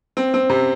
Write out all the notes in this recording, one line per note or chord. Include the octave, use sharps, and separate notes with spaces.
C4
C4
C3